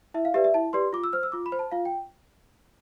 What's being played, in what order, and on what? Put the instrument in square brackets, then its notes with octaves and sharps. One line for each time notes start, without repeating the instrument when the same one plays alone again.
[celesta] E4 E5
F5
G4 B4 D5 E5
E5
E4 A5
G4 B4 D5 C6
F4 D6
E6
C5 F6
E6
F4 D6
B5
C5
A5
F4 F5
G5